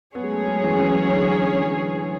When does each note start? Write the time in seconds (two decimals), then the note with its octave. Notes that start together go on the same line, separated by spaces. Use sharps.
0.15 F#3 B3 C#4 G#4 C#5
0.24 G#3
0.31 A3
0.48 G#3
0.64 E3
0.80 E3
1.13 D3